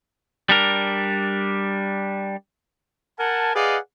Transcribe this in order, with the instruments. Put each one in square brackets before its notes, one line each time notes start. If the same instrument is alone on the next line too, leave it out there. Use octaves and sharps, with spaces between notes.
[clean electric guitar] G3 D4 A#4
[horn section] A#4 F#5 G#5 A5
G#4 B4 D5 D#5 F5 F#5